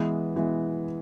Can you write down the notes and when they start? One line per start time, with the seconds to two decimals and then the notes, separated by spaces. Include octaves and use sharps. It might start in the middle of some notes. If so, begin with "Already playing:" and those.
Already playing: E3 G#3 B3
0.36 E3 G#3 B3